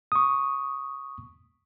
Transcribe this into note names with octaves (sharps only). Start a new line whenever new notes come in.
C#6 D#6